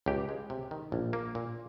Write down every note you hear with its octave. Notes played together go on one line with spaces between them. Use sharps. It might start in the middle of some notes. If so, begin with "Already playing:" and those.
C#2 G4
G#3
C3
D#3
A#1
A#3
A#2